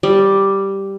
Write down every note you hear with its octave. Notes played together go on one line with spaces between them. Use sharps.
G3